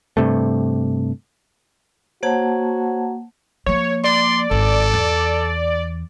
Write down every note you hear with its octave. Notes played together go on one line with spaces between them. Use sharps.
G2 C3 A3
A#3 F#4 C5 C#5 F#5 A5 G#6
F3 A#3 C#5
D5 C6
G#1 A4
E2